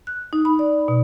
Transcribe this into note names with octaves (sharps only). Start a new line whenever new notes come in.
F#6
D#4
B5
D5
B2